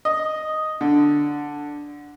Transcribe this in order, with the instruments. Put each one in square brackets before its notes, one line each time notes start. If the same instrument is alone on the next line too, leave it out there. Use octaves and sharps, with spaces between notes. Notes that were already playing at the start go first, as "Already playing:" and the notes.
[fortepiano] D#5
D3